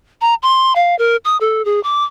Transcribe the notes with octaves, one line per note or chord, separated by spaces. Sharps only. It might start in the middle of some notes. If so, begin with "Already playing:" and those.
A#5
C6
F5
A#4
D#6
A4
G#4
D6